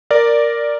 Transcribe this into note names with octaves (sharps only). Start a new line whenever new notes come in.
A#4 D5